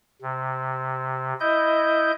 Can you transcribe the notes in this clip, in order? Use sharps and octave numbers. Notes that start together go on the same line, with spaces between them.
C3
E4 D#5 G6